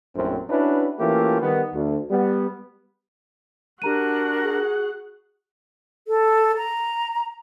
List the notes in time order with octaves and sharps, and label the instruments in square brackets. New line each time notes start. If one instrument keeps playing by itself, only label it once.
[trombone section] A#1 F#2 A2 F#3 C4
C#4 D4 E4 F#4 B4
E3 A3 A#3 C#4 F4 G4
D#3 G3 B3
D2
G3 B3
[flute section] D4 A#4 [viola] F#4 F#5 [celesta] G4 A#5 D#7
[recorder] G#4
[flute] A4
A#5